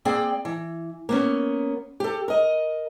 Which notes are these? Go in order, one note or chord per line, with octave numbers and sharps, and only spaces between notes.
A#3 C4 G#4 D5 G5
E3
A#3 B3 C#4
G4 A4
A#4 D#5